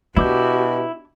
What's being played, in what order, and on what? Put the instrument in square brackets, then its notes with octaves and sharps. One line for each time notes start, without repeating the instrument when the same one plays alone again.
[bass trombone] B2 [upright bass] D4 [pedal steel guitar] E4 D6 G6 [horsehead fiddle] F#4 G4